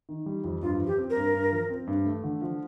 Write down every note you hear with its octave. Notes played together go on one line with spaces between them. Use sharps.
D#3
G3
F2
G2 F4
F3
G4
C4
A#4
G2
G2
F3
C4
G2
A3
D3
F3